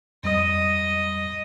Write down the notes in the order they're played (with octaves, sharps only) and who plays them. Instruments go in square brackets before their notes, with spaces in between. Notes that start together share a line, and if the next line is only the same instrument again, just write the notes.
[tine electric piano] F2 G3 D#6 [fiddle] D#5